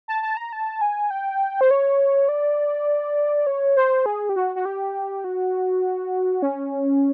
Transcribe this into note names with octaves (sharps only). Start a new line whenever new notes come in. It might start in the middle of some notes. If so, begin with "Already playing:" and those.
A5
A5
A#5
A5
G#5
G5
C5
C#5
D5
C#5
C5
G#4
G4
F#4
F#4
G4
F#4
C#4